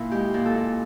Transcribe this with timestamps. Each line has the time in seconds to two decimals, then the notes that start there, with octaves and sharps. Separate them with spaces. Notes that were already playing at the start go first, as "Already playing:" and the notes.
Already playing: A#2 E4
0.12 G#3 G4
0.34 A#2
0.45 A4
0.56 A#2